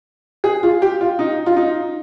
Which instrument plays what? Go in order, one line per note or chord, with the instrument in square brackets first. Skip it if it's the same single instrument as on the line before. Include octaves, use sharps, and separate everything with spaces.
[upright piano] G#4
F4
G4
F4
D#4
F4
D#4